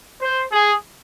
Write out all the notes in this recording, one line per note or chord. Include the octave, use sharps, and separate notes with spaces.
C5
G#4